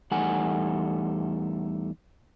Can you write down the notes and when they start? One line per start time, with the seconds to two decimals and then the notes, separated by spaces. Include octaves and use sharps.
0.11 E2 G3 A3 D#4 F#5 G#5